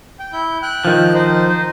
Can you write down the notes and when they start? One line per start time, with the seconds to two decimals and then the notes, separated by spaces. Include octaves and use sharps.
0.19 G5
0.33 E4 G6
0.63 G5 F#6
0.85 D#3 F3
1.14 D#4 C5